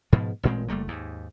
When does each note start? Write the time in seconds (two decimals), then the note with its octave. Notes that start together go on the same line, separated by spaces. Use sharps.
0.12 G#2 B2 F3
0.43 A1 A#2 G#3 C4
0.68 F#1 G3 A3 A#3
0.88 D#2 G#2